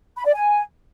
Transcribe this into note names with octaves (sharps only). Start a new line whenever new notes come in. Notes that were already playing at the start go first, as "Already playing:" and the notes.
B5
D5
G#5